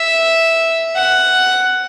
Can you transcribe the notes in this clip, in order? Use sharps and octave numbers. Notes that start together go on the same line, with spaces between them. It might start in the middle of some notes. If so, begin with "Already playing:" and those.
Already playing: E5
F#5